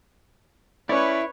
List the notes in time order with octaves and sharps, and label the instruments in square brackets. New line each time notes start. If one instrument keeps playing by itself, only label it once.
[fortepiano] C#4 D5 [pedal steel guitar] E4 [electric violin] B4 C#5